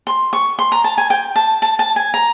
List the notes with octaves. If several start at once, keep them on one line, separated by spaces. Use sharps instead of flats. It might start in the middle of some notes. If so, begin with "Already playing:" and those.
C6
C#6
C6
A#5
A5
G#5
G5
A5
A5
A5
G#5
A#5